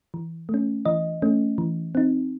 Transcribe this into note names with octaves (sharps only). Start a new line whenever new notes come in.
E3
A3
C#4
E3 D#5
A3 C#4
E3
C4 D#4